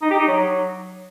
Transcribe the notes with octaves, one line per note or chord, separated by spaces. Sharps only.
D#4
G4
D#4
F#3